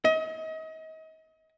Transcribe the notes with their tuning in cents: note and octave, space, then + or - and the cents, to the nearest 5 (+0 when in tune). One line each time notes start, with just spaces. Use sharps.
D#5 +35